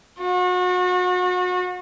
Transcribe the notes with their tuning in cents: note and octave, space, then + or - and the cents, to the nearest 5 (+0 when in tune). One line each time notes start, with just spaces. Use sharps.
F#4 -35